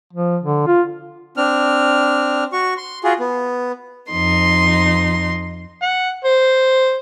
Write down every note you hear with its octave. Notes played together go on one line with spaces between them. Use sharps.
F3
D3
F4
C4 D4 F6
F#4 C#6
C6
F4 F#4 G#4
B3
F2 D#4 C6
F#5
C5